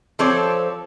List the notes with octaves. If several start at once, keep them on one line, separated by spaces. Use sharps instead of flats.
F3 C4 A4 C#5 D5